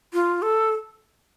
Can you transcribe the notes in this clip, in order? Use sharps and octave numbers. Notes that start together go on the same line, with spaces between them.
F4
A4